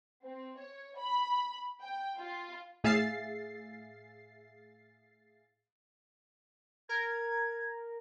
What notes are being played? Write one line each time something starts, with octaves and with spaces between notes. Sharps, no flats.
C4
C#5
B5
G5
F4
A2 G#4 E5 F5 A6 C7
A#4 G#6